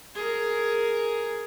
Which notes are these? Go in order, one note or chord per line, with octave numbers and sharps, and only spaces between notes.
G#4 A#4